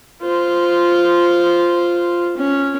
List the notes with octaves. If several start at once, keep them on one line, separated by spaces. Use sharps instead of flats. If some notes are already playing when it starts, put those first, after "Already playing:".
F4 C5
C#4